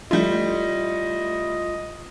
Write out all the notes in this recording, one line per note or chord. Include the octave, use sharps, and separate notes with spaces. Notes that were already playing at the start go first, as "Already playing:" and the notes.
G3 A3 E4 F4 D#5